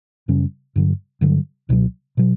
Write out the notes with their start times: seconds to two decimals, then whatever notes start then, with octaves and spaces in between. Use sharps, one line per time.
0.28 F#2 C#3 G3 C#4
0.76 G2 D3 F#3
1.21 G2 D3 F#3
1.69 C#2 B2 F#3
2.17 B2 F#3